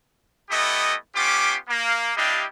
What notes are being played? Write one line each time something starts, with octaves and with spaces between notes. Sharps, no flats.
A3 B3 E4 G4 D#5
B3 C#4 F4 G4 C6 D6
A#3
G3 D4 E4 G4 D#5 F5